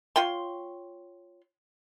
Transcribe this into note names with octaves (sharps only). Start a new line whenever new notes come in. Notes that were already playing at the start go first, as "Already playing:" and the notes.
F4 C#5 G5 C6